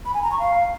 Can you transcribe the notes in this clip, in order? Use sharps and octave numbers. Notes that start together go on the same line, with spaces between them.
B5
G#5
A#5
C#6
F5